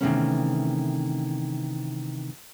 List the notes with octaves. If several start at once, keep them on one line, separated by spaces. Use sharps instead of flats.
C3 D#3 E3 A3 B3 C#4